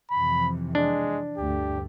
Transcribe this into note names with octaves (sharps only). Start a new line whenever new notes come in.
F2 C3 E3 B5
G#3 D4
D2 G2 A3 G4